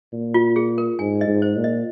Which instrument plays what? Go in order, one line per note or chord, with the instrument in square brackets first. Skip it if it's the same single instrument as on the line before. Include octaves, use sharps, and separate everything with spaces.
[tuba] A#2
[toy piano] F4
G#4
A#4
[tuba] G#2 [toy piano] G#5
[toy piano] D#5
[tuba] G#2
[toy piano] C5
[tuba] A#2
[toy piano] D#5